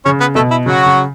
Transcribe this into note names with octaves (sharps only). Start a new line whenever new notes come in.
C#3 C#4 C#5
B3 B4
B2 A3 A4
E4
C#3 F#3 F#4
C#3